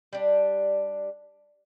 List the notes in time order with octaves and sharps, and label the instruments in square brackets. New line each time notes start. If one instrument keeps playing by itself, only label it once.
[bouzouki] G3 D4